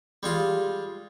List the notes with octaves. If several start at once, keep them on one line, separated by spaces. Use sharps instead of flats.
G3 G#3 F4